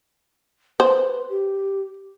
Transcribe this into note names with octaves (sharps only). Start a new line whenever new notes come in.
B4 C5
G4